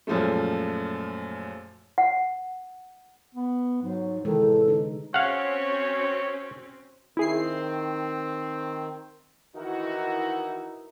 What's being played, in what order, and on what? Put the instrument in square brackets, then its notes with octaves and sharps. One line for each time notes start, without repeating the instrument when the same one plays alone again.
[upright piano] F#2 A#2 F3 G#3 A3
[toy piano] F#5
[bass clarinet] B3
[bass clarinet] G#2 [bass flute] F#3
[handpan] C3 E3 G#3 [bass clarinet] D#3 [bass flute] A4
[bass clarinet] A2
[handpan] D3 D#4
[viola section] C4 C#4 F#4 [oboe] C#5 [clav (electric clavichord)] F5 F#5
[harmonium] D#3 [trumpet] C4 [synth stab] E4 G#4 C7
[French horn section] D#3 E3 F#4 [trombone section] D#4 E4 A#4